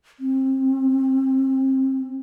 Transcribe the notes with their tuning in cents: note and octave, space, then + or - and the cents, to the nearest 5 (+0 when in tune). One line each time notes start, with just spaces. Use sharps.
C4 +25